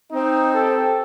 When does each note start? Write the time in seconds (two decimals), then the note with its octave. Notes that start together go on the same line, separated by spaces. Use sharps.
0.12 C4 D#4
0.54 G4 A4